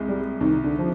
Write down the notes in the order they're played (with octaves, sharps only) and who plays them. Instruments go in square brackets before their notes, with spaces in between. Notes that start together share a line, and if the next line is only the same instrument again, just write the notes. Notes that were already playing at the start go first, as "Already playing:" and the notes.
Already playing: [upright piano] C2 G#3
[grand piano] G3
[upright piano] C2 [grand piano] D#3
[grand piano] D3
F3